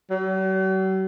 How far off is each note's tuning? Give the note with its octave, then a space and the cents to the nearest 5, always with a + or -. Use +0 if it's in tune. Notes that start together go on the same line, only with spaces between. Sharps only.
F#3 +45